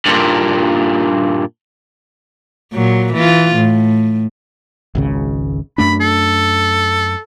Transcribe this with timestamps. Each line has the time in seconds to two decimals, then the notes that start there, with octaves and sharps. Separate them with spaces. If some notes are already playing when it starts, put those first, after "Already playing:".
0.06 G2 A#2
2.73 A#2 F#3
3.13 E3 F4
3.56 A2
4.95 G#1 C#2 C#3
5.78 F#2 A3 D4 B5
6.01 A4